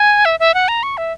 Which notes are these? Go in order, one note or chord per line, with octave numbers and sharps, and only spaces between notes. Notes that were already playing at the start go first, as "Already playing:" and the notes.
Already playing: G#5
E5
E5
F#5
A#5
C#6
E5